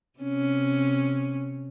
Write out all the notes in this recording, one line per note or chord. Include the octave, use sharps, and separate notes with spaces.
C3 C#4